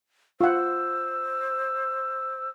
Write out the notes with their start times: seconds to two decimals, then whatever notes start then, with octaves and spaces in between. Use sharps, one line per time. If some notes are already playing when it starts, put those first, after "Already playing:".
0.41 F4 C5 F5 F#5 E6